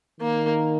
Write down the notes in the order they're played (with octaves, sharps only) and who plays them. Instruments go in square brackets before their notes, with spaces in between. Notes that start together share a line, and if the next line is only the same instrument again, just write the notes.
[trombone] D#3 [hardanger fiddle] A#3